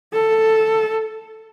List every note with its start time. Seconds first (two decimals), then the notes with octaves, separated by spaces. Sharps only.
0.13 A4